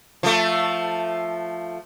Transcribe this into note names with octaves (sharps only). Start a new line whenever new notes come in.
F3 A3